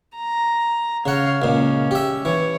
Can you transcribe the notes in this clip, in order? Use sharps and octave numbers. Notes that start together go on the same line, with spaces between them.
A#5
C#3 C#5 F5 F#5
C#2 A#2 C#4
G4 E5
E3 C#5